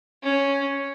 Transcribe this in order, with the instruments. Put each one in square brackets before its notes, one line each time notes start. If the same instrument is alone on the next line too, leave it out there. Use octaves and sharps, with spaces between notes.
[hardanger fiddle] C#4